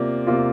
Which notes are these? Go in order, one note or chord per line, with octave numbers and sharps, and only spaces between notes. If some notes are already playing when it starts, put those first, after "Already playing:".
Already playing: C3 A#3 F4 D5
C3 A#3 F4